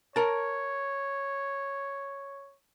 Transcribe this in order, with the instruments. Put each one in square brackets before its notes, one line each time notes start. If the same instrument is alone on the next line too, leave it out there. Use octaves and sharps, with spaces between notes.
[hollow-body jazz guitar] A#4 A5 [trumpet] C#5